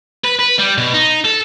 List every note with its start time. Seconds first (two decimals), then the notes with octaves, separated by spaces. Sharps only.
0.25 B4
0.39 B4
0.59 G3
0.78 B2
0.93 D#4
1.24 A4